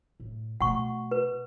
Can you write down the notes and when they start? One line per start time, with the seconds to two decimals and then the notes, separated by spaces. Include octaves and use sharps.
0.20 A2
0.61 B2 A3 F#5 C#6
1.11 B4